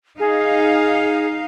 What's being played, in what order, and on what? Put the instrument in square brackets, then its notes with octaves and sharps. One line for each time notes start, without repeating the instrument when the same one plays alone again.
[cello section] D#4 F5 [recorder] G#4